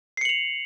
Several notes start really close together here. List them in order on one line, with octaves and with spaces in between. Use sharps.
C7 C#7 F#7 F7